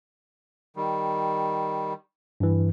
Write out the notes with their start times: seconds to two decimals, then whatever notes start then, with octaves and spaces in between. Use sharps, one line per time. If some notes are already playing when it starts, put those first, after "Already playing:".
0.76 D#3 G3
2.40 G2 E3